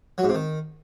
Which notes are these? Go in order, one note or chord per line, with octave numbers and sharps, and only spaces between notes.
F#3
G#2
C3
D#3